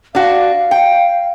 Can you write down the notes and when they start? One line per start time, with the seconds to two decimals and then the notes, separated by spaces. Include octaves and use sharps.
0.15 D4 F#4 F5
0.71 G5